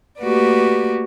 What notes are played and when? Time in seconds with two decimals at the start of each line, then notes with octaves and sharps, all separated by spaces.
0.20 A3 A#3 F#4 G4 B4 D5